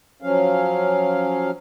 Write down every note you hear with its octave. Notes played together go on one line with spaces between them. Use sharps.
F3 F#3 C#4 F5